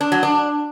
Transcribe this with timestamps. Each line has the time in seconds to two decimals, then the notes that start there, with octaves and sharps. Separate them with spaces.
0.01 D4
0.12 F#3
0.23 D4